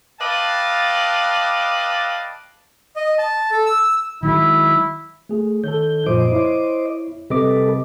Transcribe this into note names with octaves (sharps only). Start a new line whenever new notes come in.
B4 D5 D#5 F5 G5 A5
D#5
A5
A4
E6
D#3 F#3 G#3 E4
A3 G#4
D#3 A4 C#5 G6
F#2 A#2 F3 C5 D#5 D6
E4 C#5
C3 G3 A4 B4 D#5 D6